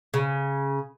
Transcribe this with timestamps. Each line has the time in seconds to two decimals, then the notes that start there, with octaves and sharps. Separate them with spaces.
0.14 C#3